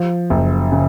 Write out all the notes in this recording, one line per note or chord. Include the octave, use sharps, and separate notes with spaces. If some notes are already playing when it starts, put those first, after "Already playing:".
Already playing: F3
F#1
C#3